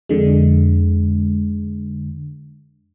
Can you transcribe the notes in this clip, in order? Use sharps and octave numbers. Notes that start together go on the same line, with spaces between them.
F2 D3 G#3